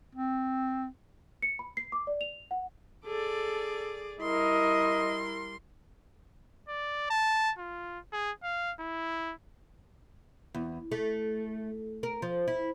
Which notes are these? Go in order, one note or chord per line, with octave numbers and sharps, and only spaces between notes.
C4
C#7
B5
C7
D6
D5
F7
F#5
G#4 A4 D5
G3 E4 A#4 D#5 C6
D5
A5
F4
G#4
F5
E4
E2
A3
A#4
F3
E4